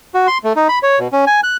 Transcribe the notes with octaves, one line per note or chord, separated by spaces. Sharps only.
F#4
C6
A3
D#4
B5
C#5
B2
C#4
G#5
F#6